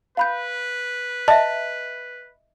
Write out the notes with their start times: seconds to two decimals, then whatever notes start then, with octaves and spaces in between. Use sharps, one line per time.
0.17 B4 F5 B5 G6
1.28 D#5 E5 A5